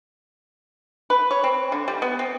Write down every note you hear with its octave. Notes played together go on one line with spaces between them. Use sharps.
B4
C#5
C4
D3
G3
B3
C4